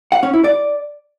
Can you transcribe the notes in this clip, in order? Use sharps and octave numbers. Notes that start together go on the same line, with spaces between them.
F#5
C#4
E4
D5